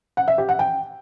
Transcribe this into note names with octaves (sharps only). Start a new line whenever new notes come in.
F#5
E5
G4
F#5
G5